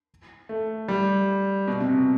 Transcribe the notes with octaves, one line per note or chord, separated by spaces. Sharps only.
A3
G3
B2
C3
B2